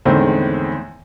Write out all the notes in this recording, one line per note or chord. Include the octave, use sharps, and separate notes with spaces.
E2 A2 D3 D#3 G#3 C4